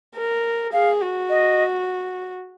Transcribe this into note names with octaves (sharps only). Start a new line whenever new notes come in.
A#4
G#4 F5
F#4
D#5